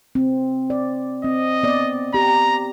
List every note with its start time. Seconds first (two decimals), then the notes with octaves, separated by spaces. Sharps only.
0.15 C4
0.70 D5
1.24 C4 D#5
1.63 B3 D5
2.14 G4 A#5